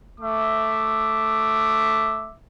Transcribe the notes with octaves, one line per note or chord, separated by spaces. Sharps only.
A3 E5 D6